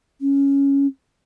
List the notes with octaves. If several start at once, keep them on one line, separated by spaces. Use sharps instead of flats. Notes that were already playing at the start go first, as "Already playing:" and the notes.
C#4